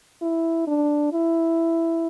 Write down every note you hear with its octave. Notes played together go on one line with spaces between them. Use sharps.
E4
D4
E4